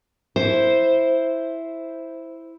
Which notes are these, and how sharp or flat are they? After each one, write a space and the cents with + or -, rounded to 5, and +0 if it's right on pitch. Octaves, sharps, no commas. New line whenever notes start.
E4 +0 C5 +0